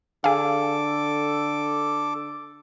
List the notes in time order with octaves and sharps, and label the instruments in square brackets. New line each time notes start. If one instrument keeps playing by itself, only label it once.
[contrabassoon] D3 [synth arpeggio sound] G#4 F5 [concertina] A4 D6